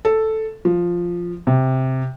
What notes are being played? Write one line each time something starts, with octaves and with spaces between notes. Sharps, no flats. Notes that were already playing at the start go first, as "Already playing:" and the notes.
A4
F3
C3